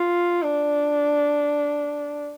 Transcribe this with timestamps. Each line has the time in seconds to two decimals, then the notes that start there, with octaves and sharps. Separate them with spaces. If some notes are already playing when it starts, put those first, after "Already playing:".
Already playing: F4
0.42 D4